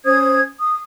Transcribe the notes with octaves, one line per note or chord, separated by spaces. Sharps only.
C#4 C5 D#6 G#6
D#6